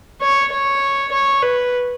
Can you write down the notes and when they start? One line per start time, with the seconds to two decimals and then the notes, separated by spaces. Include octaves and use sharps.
0.21 C#5
0.52 C#5
1.11 C#5
1.42 B4